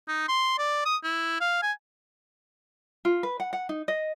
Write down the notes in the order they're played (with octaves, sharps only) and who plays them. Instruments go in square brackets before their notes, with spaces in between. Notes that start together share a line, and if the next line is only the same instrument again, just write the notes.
[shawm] D#4
C6
D5
D#6
E4
F5
G#5
[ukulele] F4
B4
F#5
F#5
D#4
D#5